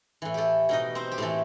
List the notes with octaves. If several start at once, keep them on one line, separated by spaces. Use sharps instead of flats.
A2 E3
A3 G4 A4
B2 D#4 D#5
C4 C5
G4
A2 E3 A3 A4